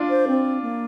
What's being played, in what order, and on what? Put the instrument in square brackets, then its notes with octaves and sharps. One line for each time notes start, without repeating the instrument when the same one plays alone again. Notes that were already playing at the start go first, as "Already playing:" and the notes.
Already playing: [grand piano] D4 F4
[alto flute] C5
C4
A#3